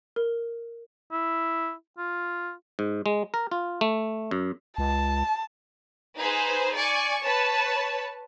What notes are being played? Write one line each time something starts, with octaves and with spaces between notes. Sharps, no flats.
A#4
E4
F4
G#2
G#3
A#4
F4
A3
F#2
C#2 A5
D#4 G#4 B4 C5
D5 G#5 C#6
B4 C#5 A5